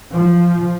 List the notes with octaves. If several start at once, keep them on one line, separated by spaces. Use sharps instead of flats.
F3